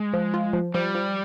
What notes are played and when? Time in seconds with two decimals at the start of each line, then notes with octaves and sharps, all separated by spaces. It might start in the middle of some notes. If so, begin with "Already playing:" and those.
Already playing: G#3
0.14 F3
0.34 F4
0.53 F3
0.74 F3 G3
0.95 F3